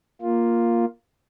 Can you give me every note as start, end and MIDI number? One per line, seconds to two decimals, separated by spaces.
0.22 0.85 58
0.22 0.85 65